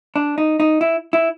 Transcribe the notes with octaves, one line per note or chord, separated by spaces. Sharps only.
D4
D#4
D#4
E4
E4